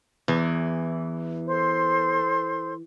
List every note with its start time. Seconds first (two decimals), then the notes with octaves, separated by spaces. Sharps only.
0.28 E2 E3
1.48 A4 C5 C6